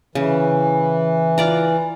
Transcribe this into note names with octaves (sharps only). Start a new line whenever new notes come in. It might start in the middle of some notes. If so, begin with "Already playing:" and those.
C#3 E3
F4 D5 A#5